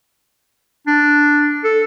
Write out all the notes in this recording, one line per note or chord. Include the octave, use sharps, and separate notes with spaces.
D4
A4